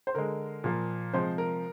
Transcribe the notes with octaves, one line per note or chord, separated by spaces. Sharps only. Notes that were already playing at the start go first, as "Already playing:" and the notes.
C5
D3 G#3 A#4
A#2 F3 A#3
C3 F3 G#3 C5
A#4